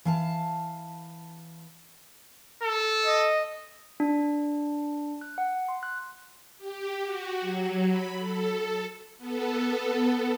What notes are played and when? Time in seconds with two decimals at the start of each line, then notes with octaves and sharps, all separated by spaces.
0.05 E3 F5 A5
2.63 A4
3.05 D#5
4.00 D4
5.21 F#6
5.38 F#5
5.68 C6
5.83 F#6
6.58 G4
7.03 F#4
7.41 F#3
7.88 B5
8.19 A4
9.18 B3 A4